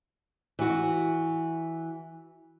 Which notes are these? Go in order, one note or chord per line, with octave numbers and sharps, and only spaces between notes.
E3 F#4